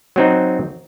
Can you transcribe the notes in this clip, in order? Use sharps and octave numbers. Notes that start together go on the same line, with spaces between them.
F#3 C4 D#4